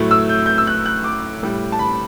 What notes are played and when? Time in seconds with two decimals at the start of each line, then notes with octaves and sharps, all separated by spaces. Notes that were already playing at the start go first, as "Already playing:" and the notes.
Already playing: A2 F#3 A3
0.11 E6
0.29 G6
0.46 G6
0.58 E6
0.67 F#6
0.86 F#6
1.04 D6
1.43 A2 G3
1.72 A5
1.79 B5